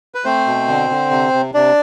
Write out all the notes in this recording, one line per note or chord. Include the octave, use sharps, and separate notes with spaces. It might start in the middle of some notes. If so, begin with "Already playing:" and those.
B4
A3 C4 C5
B2
D3
D3
C3
C3
C3 D4 D5